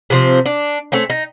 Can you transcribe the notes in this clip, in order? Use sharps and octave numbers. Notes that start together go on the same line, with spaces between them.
C3 F3 C4
D4
A3 C4 C#4
D#4